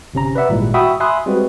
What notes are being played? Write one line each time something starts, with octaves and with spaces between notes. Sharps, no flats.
G1 C3 C#4 A#5
B4 D5 E5 F#5
G#1 A#2 G3 G#3 E4
F#4 E5 F#5 G5 B5 D#6
E5 G#5 B5 C6 D#6 F#6
G3 G#3 C4 F#4 B4